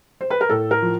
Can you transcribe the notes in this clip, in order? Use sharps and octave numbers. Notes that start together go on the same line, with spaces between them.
C5
B4
A#4
A2 A4
A#4
F3